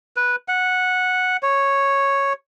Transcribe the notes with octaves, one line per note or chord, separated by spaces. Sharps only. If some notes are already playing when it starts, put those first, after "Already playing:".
B4
F#5
C#5